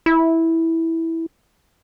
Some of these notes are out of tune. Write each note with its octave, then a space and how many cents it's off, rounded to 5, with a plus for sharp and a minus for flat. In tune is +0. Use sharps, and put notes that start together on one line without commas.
E4 -10